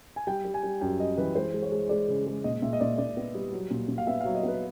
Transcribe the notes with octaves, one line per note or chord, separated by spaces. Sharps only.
G#5
G3 G5
G3
G#5
G3
F#2 G5
G3 D#5
E3 B4
G#3 C5
G#3
C#5
G#3
G#3 D5
C#3
G#3
A#2 D#5
A#2 E5
D#5
A#2 D5
A#2 D5
B3
G3
F#3
A#2
A#2
F5
B3 E5
F5
F#3
D#5
B3 B4